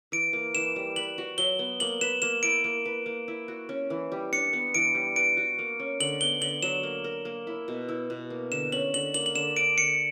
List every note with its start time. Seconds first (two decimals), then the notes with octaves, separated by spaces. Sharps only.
0.12 E3 D7
0.33 A#3
0.55 E3 E7
0.76 G3
0.96 B4 F#7
1.18 F#4
1.38 F#3 G7
1.59 B3
1.80 A#3 F#7
2.01 B4 E7
2.22 A#3 E7
2.43 E4 D7
2.64 A#3
2.86 B4
3.06 A#3
3.28 E4
3.48 F#4
3.69 C#4
3.90 E3
4.12 G3
4.33 D4 C#7
4.53 B3
4.74 E3 D7
4.95 G3
5.16 B4 D7
5.37 F#4
5.59 A#3
5.80 C#4
6.00 D3 F#7
6.21 B3 G7
6.41 D3 F#7
6.62 F#3 E7
6.83 A#3
7.04 A#4
7.25 A#3
7.47 E4
7.68 B2
7.89 E4
8.10 B2
8.30 A#3
8.52 D3 E7
8.72 C#4 F#7
8.94 D3 F#7
9.14 A#3 F#7
9.26 F#7
9.35 D3 E7
9.57 D4 D7
9.77 D3 C#7